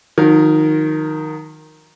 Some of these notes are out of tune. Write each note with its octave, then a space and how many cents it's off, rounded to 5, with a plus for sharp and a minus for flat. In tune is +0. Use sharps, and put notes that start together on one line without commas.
D#3 +0 F#3 -45 A#4 +0